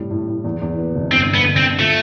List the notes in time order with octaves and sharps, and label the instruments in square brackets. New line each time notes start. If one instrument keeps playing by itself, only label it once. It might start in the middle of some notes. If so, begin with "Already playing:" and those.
Already playing: [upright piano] A2 C3 G3
A2
A2
E2
E2
B3
F1
[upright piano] G1 [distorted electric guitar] C4
[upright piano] F2
[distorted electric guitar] B3
[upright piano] D3
[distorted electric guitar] C4
[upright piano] D3
[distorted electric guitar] A3 [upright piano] F4